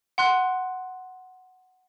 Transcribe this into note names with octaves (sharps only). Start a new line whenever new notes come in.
F#5 C6 F#6